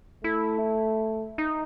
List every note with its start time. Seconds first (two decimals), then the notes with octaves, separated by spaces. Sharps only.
0.24 A3 E4
1.38 D#4